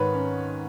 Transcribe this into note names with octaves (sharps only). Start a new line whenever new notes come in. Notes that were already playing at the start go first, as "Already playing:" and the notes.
Already playing: G#2 D#3 B4 C#5
C#4